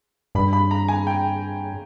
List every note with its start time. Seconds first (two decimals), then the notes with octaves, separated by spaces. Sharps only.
0.35 G2 B5
0.53 B5
0.71 A#5
0.88 G#5
1.07 G5